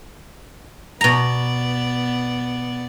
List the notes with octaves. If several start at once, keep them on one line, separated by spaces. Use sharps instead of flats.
B2 B3 D5 A#5